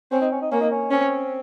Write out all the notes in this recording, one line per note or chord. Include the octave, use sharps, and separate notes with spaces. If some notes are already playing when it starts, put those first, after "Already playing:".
C4 C#4
D#4
C#4
D#4
A#3 C#4
D#4
C#4
C4 C#4